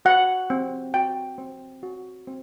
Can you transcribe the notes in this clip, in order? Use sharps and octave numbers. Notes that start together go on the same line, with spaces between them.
F#4 F#5
C4
F#4 G5
C4
F#4
C4